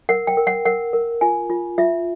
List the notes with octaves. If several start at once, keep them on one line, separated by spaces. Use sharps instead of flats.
A#4 F#5
G5
A#4
F#5
A#4 F#5
A#4
F4 G#5
F4
F4 E5